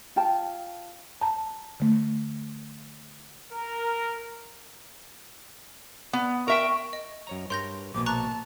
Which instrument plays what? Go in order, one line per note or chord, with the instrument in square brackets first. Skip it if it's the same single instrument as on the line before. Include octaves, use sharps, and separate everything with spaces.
[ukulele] F4 G5 A5
[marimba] A5 A#5
D3 A3
[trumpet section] A#4
[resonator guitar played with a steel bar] B3
[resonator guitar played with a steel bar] A#4 E5 G5 [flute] C#6
[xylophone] D#5
[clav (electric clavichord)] F#2 C#5 A#5
[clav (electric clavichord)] G2 A#4 C#5 [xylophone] C6 G6 A#6
[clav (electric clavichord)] A#1 B2 [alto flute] A#3 [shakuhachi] D6
[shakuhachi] A5 [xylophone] A#5 C#6 F#6